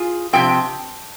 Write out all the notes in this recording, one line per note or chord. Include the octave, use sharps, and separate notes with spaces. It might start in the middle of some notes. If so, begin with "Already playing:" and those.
Already playing: F4 G#4
C3 F3 C4 G5